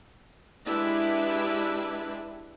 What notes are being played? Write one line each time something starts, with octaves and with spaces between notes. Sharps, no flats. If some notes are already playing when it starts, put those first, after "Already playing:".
G#3 D4 E4 G4 B4 E5